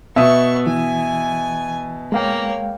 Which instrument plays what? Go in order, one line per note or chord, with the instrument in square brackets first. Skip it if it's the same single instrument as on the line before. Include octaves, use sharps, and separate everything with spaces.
[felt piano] B2 D#6 [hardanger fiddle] B3 C#6 [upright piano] E5
[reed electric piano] E3 [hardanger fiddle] G#5
[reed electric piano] G#3 F5 G5 [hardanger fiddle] A#3 C#5